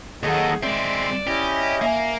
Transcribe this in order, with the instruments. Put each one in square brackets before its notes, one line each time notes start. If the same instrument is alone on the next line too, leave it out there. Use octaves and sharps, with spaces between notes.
[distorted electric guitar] D#2 D#3 [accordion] F#3 A4 D#5 [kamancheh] G#4 F#5
[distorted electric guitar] G#3 C4 [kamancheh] D5 [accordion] E5
[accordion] C#4 E4 D#5 [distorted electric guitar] G4
[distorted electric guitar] A#3 [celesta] E5 G#5